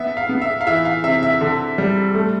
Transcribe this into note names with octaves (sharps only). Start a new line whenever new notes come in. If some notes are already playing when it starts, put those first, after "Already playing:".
Already playing: B3 E5
F5
B3
E5
F5
E3 E5
F5
C3 E5
E5
D3
G3
A3